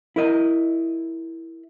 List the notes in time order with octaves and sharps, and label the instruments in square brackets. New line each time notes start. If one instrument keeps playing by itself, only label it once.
[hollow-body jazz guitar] E4 A#4 D#5